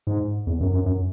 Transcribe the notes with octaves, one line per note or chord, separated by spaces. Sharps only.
G#2
E2
F#2
F#2
F#2